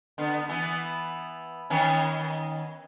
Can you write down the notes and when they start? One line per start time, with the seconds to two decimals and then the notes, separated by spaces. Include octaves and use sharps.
0.18 D3 B3
0.49 E3 B3
1.70 D#3 B3 C#4